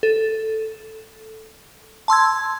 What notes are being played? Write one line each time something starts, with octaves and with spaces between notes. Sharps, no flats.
A4
A5 C6 E6 G#6